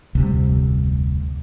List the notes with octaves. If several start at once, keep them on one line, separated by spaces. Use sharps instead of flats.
F1 D2 C3 G3